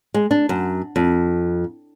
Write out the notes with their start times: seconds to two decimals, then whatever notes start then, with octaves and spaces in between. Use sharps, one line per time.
0.14 G#3
0.31 D4
0.49 F#2
0.96 F2